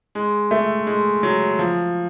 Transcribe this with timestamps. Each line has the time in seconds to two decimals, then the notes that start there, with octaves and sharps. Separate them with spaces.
0.15 G#3
0.51 A3
0.87 G#3
1.23 F#3
1.59 F3